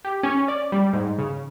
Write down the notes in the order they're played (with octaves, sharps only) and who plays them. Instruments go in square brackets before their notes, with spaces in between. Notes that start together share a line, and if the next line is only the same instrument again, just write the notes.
[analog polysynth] G4
C#4
D5
G3
G#2
C#3